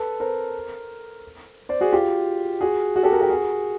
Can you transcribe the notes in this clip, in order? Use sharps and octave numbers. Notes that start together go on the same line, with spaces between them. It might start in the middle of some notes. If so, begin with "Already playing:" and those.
Already playing: A4 B4
A#4 C5
C5 D5
F#4 G#4
F4 G4
F#4 G#4
F#4 G#4
G4 A4
G#4 A#4
G4 A4
F#4 G#4